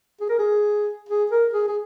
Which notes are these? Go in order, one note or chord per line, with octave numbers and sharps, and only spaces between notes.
G#4
A#4
G#4
G#4
A#4
G#4
G#4